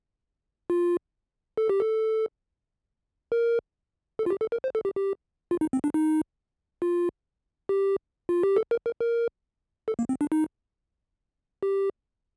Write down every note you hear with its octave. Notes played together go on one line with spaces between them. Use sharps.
F4
A4
G4
A4
A#4
A4
F4
G4
A4
A#4
C5
A4
G4
G4
F4
D#4
C4
D4
D#4
F4
G4
F4
G4
A4
A#4
A#4
A#4
A4
A#3
C4
D4
D#4
G4